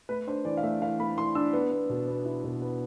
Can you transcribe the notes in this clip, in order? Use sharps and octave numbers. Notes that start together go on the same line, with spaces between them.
A3 B4
D4 C5
E3 D5
F5
A3 E5
E3 F5
A3 B5
E3 C6
D4 E6
B3
B3
B2
B3
E4
B2
B3